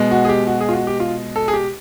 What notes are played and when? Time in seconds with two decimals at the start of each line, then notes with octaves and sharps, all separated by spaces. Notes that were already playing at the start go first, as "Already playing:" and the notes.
Already playing: B2 G#3
0.11 F#4
0.25 G#4
0.29 G4
0.47 F#4
0.61 G#4
0.69 F4
0.73 F#4
0.87 G4
1.00 F4
1.36 A4
1.48 G#4
1.53 G4